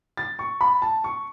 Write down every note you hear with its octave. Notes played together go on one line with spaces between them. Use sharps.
A6
C#6
B5
A5
C#6